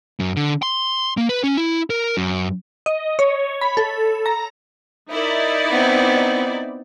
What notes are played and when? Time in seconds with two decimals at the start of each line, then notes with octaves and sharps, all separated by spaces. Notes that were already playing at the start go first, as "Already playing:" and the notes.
0.20 F#2
0.36 D3
0.63 C6
1.17 A#3
1.29 B4
1.44 C#4
1.57 E4
1.90 A#4
2.17 F#2
2.86 D#5
3.19 C#5
3.61 B5
3.77 A4
4.26 A#5
5.11 D#4 E4 A#4 D5
5.68 B3 C4